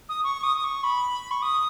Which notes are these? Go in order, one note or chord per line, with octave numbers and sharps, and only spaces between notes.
D#6
C#6
D#6
D#6
C#6
B5
C#6
D#6